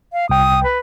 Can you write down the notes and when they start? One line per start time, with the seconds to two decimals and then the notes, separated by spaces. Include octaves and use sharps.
0.13 F5
0.29 C2 G5 D#6
0.64 B4